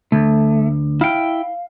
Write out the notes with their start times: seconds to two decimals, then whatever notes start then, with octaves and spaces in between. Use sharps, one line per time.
0.12 D2 A3
1.01 E4 F5 G5